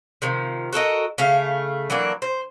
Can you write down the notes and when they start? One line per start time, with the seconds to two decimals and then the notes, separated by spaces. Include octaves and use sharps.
0.22 C3 D#3 F3
0.73 F#4 A4 A#4 D#5
1.18 C#3 A3 F5
1.90 E3 F#3 A#3 D4
2.22 C5